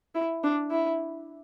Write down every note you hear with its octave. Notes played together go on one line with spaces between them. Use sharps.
E4
D4
E4